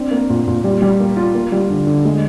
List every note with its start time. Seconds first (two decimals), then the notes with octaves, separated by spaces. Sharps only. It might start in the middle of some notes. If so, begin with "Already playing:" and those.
Already playing: C4 D4
0.11 A#3
0.30 A#2
0.48 A#2
0.64 G3
0.82 G3
1.00 A#3
1.17 F4
1.35 A#3
1.52 G3
1.70 D3
1.87 D3
2.05 G#3